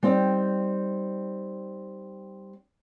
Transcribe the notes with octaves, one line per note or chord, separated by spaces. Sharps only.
G3 C4 D#4 D5